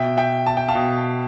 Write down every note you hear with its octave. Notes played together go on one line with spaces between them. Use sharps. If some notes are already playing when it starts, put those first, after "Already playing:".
Already playing: B2 E5 G5
E5 G5
A5
G5
F5 A5
B2